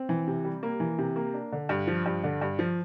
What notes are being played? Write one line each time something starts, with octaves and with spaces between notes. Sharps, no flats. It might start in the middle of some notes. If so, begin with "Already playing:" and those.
Already playing: C4
E3
C3
G3
A#3
E3
C3
A#3
D4
D3
G2
F3
G2
D3
G2
F3